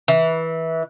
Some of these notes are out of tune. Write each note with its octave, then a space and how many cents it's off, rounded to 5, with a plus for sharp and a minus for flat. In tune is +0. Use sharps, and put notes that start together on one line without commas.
E3 -20